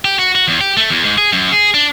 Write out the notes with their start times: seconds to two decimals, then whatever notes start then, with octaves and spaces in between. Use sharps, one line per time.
0.05 G4
0.19 F#4
0.35 F#4
0.48 E2
0.61 G4
0.77 A3
0.91 E2
1.05 G#2
1.18 G#4
1.33 F#2
1.52 G#4
1.74 D4